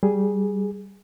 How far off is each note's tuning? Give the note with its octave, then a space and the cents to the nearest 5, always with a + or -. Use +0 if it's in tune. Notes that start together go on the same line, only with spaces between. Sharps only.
G3 -5 G#4 +0